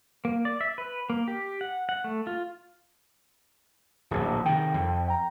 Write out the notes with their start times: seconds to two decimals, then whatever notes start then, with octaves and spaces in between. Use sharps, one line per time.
0.25 A#3
0.45 D5
0.61 E5
0.78 B4
1.10 A#3
1.28 G4
1.61 F#5
1.89 F#5
2.04 A3
2.27 F4
4.11 D1 A#1
4.45 C3 D#3 G5
4.74 F2
5.08 G5 A#5